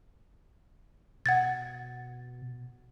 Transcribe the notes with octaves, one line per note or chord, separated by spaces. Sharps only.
B2 F#5 G#6 A6